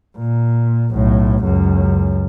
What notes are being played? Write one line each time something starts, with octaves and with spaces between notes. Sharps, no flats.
A#2
B1 A2
C#2 F#2